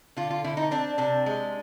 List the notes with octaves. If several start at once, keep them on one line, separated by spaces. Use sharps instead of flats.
D3 F4
F4
D3 E4
D#4
C4 D4
C3 D4
G#3